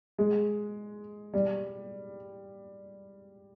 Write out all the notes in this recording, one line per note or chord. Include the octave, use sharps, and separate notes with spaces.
G#3
G3